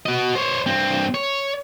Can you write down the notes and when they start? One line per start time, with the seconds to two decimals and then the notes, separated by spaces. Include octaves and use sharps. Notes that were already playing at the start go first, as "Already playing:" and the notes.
0.06 F#4 D#5
0.35 C5 C#5
0.66 G2 C4
1.14 C#5